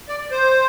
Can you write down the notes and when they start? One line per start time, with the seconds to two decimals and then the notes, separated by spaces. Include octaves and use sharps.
0.09 D5
0.31 C5